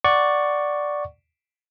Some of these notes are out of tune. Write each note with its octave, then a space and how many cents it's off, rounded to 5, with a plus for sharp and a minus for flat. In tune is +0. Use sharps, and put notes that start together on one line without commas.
D5 +0 F#5 +0 C#6 +0